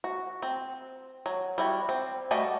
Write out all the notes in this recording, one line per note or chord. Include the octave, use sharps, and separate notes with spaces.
F#4
C4
F#3
G3 E4 F#4
C4
G3 A3 F#4 D5 D#5